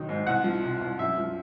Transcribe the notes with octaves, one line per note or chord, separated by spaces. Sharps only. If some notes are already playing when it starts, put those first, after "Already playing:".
Already playing: C3 D#3 F#3
G#2
C2 F#5
F3
C3
C2
F#2 E5
F3